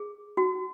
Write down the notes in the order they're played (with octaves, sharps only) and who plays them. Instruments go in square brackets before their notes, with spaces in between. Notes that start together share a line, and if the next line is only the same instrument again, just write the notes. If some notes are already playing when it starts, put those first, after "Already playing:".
Already playing: [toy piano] G#4
F#4